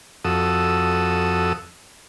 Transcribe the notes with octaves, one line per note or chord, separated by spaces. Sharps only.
F2 F#4 A4 D#6 E6